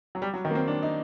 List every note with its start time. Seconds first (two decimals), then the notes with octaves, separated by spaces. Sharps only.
0.15 F#3
0.22 G3
0.34 F#3
0.45 D#3
0.51 A#3
0.55 C4
0.67 D4
0.83 D#4